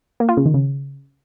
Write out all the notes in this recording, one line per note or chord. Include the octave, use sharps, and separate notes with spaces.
A#3
F4
C#3
D#3
C#3